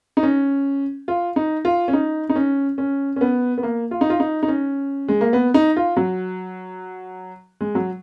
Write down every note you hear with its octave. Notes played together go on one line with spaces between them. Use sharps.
D#4
C#4
F4
D#4
F4
C#4
D#4
D#4
C#4
C#4
C#4
B3
B3
A#3
F4
D#4
F4
D#4
D#4
C#4
G#3
A#3
B3
D#4
F4
F#3
G#3
F#3